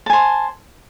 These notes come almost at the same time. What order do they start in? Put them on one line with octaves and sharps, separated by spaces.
A5 G#5 C5